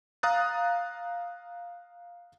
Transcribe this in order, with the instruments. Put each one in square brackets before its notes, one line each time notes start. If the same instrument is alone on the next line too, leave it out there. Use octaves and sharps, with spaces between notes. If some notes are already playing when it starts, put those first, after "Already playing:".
[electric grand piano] F5 A#5 D#6 F#6 A6